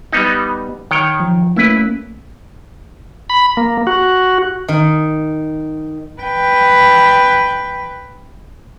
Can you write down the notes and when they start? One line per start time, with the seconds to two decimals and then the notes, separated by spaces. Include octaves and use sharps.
0.12 G3 B3 D#4
0.91 D#3 C#5 G5
1.20 F3
1.56 A3 A#3 C#4 E4 B4
3.30 B5
3.57 A#3
3.87 F#4
4.68 D#3
6.22 B4 G5